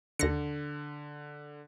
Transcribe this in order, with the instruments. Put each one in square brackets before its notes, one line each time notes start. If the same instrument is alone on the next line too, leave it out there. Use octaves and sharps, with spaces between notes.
[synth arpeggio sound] D#2 A#6 C#7 [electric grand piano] D3